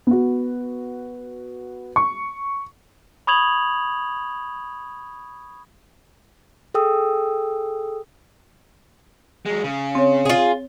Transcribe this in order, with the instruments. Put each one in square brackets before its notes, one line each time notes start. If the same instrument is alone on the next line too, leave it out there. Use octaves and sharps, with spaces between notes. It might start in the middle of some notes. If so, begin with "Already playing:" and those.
[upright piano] B3 F#4
C#6
[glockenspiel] B5 C#6 D#6 G#6 F7 F#7
[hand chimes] G#4 A4 G5 D#6 E6
[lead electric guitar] F#3 G#3
C#3
[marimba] C4 C#5
[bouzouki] F4 G#4